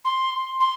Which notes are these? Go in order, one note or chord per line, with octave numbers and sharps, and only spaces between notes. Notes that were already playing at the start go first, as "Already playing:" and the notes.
C6
C6